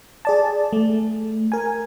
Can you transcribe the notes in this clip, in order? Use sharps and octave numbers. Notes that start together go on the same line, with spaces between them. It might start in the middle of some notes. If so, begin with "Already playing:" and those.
G#4 D5 A5
A3
A#4 G#5